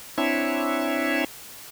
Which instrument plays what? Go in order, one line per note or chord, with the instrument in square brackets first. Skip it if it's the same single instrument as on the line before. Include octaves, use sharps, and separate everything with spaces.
[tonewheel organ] C4 D4 E4 C#5 E5